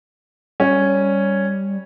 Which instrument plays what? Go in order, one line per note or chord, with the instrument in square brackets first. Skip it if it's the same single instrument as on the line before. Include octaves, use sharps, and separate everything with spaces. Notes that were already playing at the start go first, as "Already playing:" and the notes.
[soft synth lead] G3 [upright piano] C#4